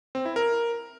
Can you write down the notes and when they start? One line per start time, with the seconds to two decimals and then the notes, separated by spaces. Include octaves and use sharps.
0.15 C4
0.25 E4
0.36 A#4